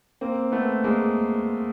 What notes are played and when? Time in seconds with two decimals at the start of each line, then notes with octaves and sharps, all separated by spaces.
0.21 A#3 C4
0.52 A3 B3
0.84 G#3 A#3